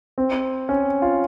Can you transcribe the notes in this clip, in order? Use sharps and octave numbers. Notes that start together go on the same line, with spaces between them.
C4
C#4
F4